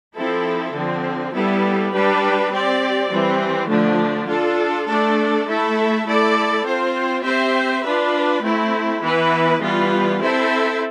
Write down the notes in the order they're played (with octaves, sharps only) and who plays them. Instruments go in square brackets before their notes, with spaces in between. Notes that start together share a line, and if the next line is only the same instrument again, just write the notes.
[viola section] F3 C4 E4 A4
D3 F3 C4
G3 B3 E4 A4
G3 D4 G4 B4
C4 G4 D5
E3 G3 C4
D3 F3 A3 D4
D4 F4 A4
A3 D4 A4 D5
A3 E4 A4 E5
A3 E4 A4 D5
C4 F4 C5
C4 G4 C5 E5
D4 F4 B4
A3 C4 E4
E3 B3 E4 B4
E3 G3 B3 F4 B4
C4 E4 A4 C5 E5